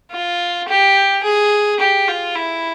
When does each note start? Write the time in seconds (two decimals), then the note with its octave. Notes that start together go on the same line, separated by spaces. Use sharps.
0.11 F4
0.68 G4
1.23 G#4
1.80 G4
2.08 F4
2.35 E4